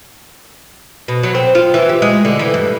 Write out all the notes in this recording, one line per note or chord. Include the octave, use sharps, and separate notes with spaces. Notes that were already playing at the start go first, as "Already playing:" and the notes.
B2
F#3
C4
F4
E3
G4
G#3
D3
E3
G2